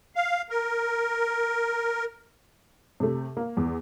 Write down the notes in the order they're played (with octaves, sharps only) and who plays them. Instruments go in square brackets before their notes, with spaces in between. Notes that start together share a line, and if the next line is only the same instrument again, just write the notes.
[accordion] F5
A#4
[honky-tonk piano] C3 A3
A#3
E2